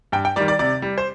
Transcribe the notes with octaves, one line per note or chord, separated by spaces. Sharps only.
G2 G5
G5
D#3 G3 D5
D5
C3 D5
G3
C5